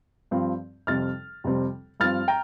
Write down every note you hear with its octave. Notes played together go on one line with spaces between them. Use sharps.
G2 F3 C4
F2 C3 G3 C4 F6 A6
F2 C3 G3 C4
G2 F3 C4 F6 A6
G5 A#5